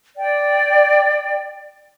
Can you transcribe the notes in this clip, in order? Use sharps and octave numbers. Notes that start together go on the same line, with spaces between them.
D5 G5